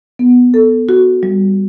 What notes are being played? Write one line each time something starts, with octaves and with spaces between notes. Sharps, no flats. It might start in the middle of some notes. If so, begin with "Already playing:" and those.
B3
A4
F#4
G3